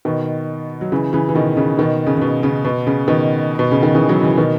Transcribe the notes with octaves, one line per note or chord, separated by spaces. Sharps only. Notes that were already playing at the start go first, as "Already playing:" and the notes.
B2 D#3
F#3
C#3 E3
C#3 E3
E3
B2 D#3
C#3
B2 D#3
C#3
C#3
B2
C#3
B2
C#3
B2 D#3
B2
C#3
D#3
C#3 E3
D#3 F#3
C#3 E3
B2 D#3